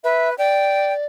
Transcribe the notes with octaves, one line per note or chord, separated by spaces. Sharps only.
B4 E5
D5 G5